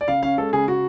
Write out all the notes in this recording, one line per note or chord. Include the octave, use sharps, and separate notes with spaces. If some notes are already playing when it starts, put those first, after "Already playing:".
D5
C#3 F5
C#4 F5
G#3 A4
C#3 G#4
C#3 F#4